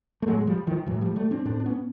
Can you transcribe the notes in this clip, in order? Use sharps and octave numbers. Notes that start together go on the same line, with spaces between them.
A3
A2 F#3 G#3
G#3
F3 G3
D#3 F3
A2 E3 F#3
F3 G3
G3 A3
C4 D4
A2 C4 D4
D4
B3 C#4